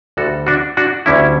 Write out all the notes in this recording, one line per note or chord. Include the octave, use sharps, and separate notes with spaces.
D2 D3 G3 F#4 A4
D4 F#4
D4 F#4
D2 D3 G3 C#4 E4